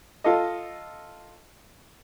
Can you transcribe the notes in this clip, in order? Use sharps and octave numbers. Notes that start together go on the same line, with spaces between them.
F4 A4 D#5